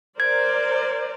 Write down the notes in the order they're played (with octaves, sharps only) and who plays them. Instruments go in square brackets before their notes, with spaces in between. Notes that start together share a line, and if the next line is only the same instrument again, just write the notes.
[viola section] A#4 C5 D5 [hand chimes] G#6